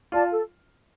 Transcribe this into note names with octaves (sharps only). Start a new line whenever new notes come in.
F4 D5 A5
A4